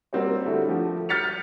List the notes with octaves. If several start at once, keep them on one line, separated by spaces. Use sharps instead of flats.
G3 A#3 C4 F#4 G4 C#5
D3 G3 A3 E4 F#4
F3 A3 F#4 G4
F6 G6 A6 B6 C#7 F7